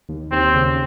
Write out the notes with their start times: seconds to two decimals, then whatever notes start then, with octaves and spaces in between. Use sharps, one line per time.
0.09 D#2
0.31 D#2 C4
0.54 C#3